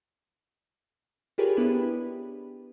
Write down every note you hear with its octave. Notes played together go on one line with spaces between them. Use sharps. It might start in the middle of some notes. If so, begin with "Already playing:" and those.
F4 G4 G#4 A#4 B4 C#5
B3 D4 E4 G4 B4